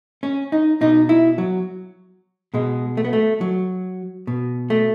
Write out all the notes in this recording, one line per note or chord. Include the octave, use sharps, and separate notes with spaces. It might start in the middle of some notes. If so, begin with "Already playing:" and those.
C#4
D#4
B2 D#4
E4
F#3
B2 G#3
A3
B3
A3
F#3
B2
A3